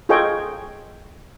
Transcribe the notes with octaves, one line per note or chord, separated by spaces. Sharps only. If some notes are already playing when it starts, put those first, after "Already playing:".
F4 G#4 A4 C#5 D#5 G5